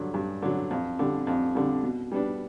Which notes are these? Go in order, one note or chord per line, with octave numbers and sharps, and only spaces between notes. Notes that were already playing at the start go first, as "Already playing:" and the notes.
Already playing: G2 D3 F#3
G2
D3 F#3
F2
D3 G3
F2
D3 G3
B2
G3 B3 D4